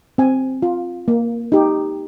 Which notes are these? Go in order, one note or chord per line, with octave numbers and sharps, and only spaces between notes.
C4 G#5
F4
A#3
D#4 G4